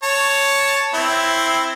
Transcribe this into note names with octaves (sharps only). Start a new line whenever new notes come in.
C#5 A5
C4 E4